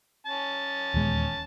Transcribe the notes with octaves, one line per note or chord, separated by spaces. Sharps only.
C#4 A5
D#1 E2 G#3